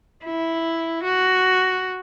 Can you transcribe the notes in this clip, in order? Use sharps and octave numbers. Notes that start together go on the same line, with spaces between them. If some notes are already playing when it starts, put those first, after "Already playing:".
E4
F#4